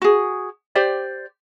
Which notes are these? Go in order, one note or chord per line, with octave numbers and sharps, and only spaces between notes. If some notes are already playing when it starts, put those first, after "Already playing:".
F#4 G#4
G4 C5 D5